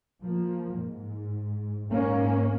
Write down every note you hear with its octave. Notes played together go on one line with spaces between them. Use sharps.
F3 A#3
G#2
G#2 A#3 C#4